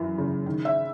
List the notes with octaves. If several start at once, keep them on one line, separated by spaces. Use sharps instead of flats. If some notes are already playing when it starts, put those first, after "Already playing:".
Already playing: F#2 E3
C#3
D#3
E5